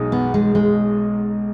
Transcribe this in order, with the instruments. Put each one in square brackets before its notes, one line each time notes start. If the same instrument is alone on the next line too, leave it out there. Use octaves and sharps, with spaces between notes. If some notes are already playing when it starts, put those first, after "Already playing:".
Already playing: [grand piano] B1 B2 G#3 D#4
[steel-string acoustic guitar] B3
G#3
G#3